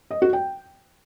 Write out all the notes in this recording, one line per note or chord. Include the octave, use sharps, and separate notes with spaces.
D#5
F#4
G5